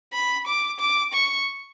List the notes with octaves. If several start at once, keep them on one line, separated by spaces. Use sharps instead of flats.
B5
D6
D6
C#6